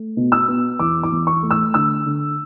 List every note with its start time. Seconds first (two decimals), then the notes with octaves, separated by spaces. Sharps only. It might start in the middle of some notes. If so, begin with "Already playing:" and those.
Already playing: A3
0.17 B2
0.32 E6
0.48 B3
0.79 E2 D6
1.03 D6
1.12 E2
1.27 C#6
1.42 A3
1.51 E6
1.74 D3 E6
2.06 D3